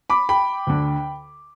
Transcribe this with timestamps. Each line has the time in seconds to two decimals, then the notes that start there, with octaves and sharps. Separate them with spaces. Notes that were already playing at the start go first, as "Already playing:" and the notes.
0.10 B5 D6
0.29 G5 B5
0.67 D2 D3